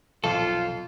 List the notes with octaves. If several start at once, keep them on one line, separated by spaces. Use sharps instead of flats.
B1 F2 F4 A4